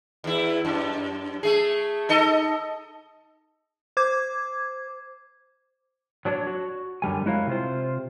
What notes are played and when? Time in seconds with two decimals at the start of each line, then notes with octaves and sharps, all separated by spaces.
0.24 E2 E4
0.65 F#2
1.43 A3 G#4
2.09 D#4 A4 D#5
3.97 C5 D6 G#6
6.25 F#3 D4 F#4 C#5
6.47 F#4
7.02 F#2 D3 G3 G#5
7.26 G#3 E4 F#4 A#4 C#5 F5
7.47 C3 F4 C5